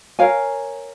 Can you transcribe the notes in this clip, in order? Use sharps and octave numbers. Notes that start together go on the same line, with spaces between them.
A#4 C#5 F5 G#5